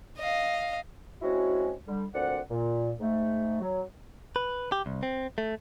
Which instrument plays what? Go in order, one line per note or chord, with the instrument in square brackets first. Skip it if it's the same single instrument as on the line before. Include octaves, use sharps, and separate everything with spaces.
[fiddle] D#5 F5
[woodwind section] G#3 C4 C#4 E4 F#4
D3 G3
D2 A#2 C4 D5 F#5
A#2
G#2 A3
F#3
[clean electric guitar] B4
G4
C2
C4
A3